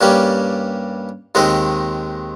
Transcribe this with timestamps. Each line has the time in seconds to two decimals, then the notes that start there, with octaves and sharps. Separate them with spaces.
0.01 G2 G3 A#3 C#4 G4
1.35 D#2 D#3 G#3 C4 D#4